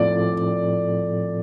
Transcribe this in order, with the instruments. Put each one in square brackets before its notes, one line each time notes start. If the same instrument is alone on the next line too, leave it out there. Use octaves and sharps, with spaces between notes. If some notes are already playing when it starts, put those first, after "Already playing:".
Already playing: [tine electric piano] A2 F3 C4 F4 A4 [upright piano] D5